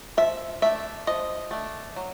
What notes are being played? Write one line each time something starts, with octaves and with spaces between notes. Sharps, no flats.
F3 E5
A3 D4 E5
F3 D#5
A3 D4
F#3